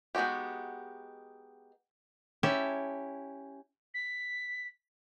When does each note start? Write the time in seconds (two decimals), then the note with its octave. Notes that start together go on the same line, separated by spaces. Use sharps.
0.15 G#3 B3 D#4 F#4 G4
2.43 C#4 E4 G4 E5 A5
3.94 B6